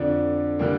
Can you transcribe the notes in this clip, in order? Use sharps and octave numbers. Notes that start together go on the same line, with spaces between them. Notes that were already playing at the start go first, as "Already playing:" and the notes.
Already playing: F2 D3 F3 D4
D3 G3 A#3